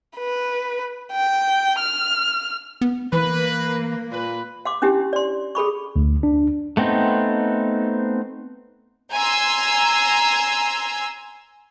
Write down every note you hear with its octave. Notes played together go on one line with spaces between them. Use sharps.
B4
G5
F6
B3
E3 A#3 B4
A#2 B4
F5 C6 D6
C#4 D4 E4 G4
D5 C6
G#4 A4 B5 C#6
D2
D4
A3 B3 C4 D#4
G#5 A#5 C6 E6